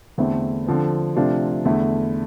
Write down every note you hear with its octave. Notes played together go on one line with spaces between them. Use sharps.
E2 D3 A3 C4 E4
D3 F3 C4
C3 F3 A3 D4 F4
E2 D3 A3 E4